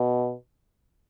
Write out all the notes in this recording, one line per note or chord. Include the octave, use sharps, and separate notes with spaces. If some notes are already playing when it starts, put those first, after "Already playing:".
Already playing: B2